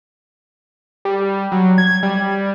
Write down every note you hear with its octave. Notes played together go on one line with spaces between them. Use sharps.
G3
F#3
G#6
G3